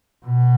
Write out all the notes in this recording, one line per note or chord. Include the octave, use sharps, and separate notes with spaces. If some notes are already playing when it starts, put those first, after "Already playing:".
B2